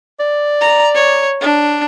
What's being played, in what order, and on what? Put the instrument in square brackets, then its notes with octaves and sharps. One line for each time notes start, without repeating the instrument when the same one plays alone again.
[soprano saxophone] D5
[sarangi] A#5
C#5
D4